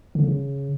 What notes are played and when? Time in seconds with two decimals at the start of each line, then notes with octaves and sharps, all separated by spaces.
0.15 D3
0.24 C#3